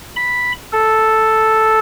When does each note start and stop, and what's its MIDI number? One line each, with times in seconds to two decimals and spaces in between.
0.16 0.52 83
0.73 1.79 69